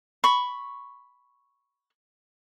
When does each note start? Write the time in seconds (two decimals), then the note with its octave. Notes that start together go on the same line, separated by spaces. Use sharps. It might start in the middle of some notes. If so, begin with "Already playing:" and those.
0.24 B5 C#6